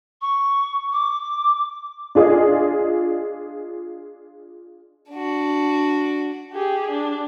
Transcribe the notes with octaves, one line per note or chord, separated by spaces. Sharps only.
C#6
D6
D4 F4 G#4 D5 D#5
D4 F#4
G4 G#4
D4